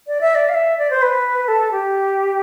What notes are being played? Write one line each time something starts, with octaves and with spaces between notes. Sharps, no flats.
D5
E5
D5
F5
E5
D5
C5
B4
A4
G4